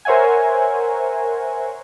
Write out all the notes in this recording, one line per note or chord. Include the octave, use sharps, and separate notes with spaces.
A#4 C5 C#5 E5 F#5 G#5